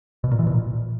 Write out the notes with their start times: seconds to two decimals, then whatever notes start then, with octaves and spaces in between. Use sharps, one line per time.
0.24 B2
0.31 A#2
0.39 E3
0.47 B2
0.54 A#2